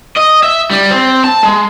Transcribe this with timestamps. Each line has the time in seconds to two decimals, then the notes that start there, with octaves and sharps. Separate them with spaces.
0.16 D#5
0.43 E5
0.71 G3
0.91 C4
1.24 A5
1.43 G#3